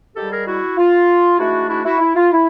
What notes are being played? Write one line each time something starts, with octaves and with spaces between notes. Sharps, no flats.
G#2 D#3 G3 G4 A4
G#4 A#4
E4 F#4
F4
G#2 E3 A3 D4 E4 F#4
E4 F#4
E4 F#4
E4
F4
E4